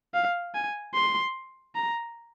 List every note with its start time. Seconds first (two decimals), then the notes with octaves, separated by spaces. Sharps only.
0.14 F5
0.55 G#5
0.94 C6
1.75 A#5